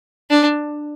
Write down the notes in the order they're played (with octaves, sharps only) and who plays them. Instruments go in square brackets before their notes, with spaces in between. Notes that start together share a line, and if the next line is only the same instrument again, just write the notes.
[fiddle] D4